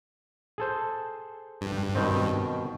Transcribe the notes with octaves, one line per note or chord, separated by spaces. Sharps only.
G#4 A4 C5
G2
B2 D#3 C4